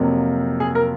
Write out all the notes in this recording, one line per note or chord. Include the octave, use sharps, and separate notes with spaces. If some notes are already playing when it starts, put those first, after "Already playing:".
Already playing: F2 C3 F#3 A#3
G#4
A#4